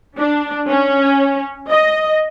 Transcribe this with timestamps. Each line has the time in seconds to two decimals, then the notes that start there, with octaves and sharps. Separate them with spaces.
0.18 D4
0.68 C#4
1.69 D#5